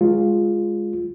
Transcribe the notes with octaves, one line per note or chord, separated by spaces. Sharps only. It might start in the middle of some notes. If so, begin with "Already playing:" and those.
G#3 F4